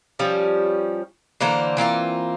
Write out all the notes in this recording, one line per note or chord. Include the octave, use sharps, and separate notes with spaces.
F3 G3 C#4
D3 E3 A#3 C5
E3 A#3 C4 F4